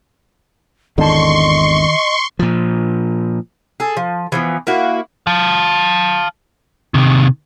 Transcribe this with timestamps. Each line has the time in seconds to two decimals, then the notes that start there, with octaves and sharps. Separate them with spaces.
0.98 G#1 E2 D3 D#3 D#5 A5 C6 C#6
2.39 A#2 F3
3.80 G#4 A4
3.97 F3
4.32 E3 F3 B3
4.67 A#3 E4 F#4
5.27 F5 A5
6.94 C3 D#3